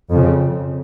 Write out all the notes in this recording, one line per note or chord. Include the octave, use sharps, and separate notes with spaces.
F2 C#3